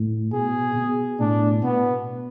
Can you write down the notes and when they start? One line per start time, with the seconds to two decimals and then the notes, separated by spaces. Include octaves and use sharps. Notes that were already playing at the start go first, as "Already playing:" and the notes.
Already playing: A2
0.32 B2 G#4
0.75 B2
1.20 A2 D4
1.64 B2 B3